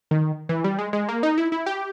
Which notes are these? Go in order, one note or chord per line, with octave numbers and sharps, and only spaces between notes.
D#3
E3
G3
G#3
G#3
A#3
D#4
E4
E4
G4